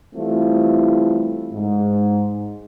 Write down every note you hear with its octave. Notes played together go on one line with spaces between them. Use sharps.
E3 G3 A3 C4 E4 F4
G#2